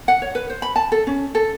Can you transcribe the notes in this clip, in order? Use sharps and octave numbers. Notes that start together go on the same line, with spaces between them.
F#5
C#5
B4
C5
B5
A5
A4
C#4
A4